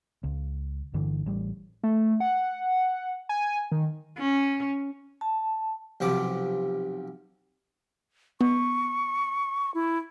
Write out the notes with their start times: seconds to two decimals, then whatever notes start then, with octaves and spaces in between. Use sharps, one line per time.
0.24 C#2
0.94 G1 G2 D3 E3
1.26 A1 G3
1.83 A3
2.20 F#5
3.29 G#5
3.72 D#3
4.18 C#4
5.21 A5
6.00 B1 C3 F3 D6
8.41 B3 C#6
9.74 E4